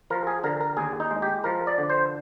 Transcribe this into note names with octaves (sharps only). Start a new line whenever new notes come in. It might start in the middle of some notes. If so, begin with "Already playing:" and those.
F3 A#4
G#4
D3 A#4
A#4
D#2 G#4
D#4
G#3
G4
F3 A#4
D5
D3
C5